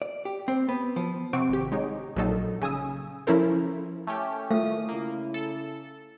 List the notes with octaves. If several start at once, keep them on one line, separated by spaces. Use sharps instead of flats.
D5
G4
C4
B3
F3
C3 C4 F#5 C#6 D6 D7
G#1 G4
G#3 D#4 C#5
A#1 A#2 F#3 D#4 A4
C#3 G#5 D#6 E6
F3 C#4 E4 A4 A#4 C5
A3 C#4 G4
D#3 A3 F4 D#6
C#3 A#3 E4
A4